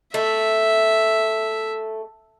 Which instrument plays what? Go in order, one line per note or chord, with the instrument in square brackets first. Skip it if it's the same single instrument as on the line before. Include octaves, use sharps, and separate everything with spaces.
[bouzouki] A3 [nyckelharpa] E5